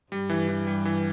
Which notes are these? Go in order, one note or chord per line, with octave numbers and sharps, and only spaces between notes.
G2 G3
E3
E3
G3
E3